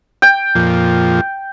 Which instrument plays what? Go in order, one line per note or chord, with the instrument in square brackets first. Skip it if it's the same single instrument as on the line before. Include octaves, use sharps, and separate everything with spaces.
[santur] G5
[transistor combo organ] F2 A#2 F3